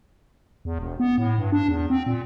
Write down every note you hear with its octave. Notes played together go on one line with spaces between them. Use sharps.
E2
E1
B3
A2
G2
D4
E2
C4
A#2